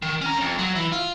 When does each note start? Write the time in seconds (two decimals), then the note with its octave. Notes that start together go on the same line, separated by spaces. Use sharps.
0.02 D#3
0.21 C#4 A#5
0.41 F2
0.58 F#3
0.75 E3
0.92 F4